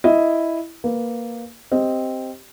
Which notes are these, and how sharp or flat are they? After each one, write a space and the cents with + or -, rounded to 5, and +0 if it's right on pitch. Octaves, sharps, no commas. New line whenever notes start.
E4 +0 D#5 +0
A#3 +0 B4 +0
C4 +0 G4 +0 D#5 +5